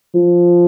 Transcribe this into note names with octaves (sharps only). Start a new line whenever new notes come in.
F3